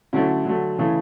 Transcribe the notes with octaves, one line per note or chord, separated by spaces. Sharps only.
D3 F#3 A3 C#4 E4
D3 F#3 A3
C#3 E3 A3